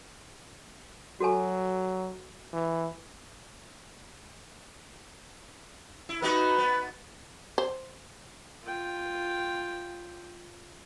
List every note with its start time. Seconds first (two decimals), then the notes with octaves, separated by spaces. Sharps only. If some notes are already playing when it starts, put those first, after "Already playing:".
1.20 F#3 F#4 A4 G#5
2.53 E3
6.09 E4
6.22 B3 D#4 F#4 B4
6.58 B3
7.58 C5
8.64 F4 G5